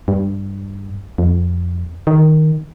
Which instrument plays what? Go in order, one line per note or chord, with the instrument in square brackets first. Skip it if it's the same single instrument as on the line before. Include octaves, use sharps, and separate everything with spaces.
[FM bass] G2
F2
D#3